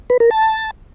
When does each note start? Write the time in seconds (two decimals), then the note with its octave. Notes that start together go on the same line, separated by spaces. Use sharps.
0.10 B4
0.20 A#4
0.31 A5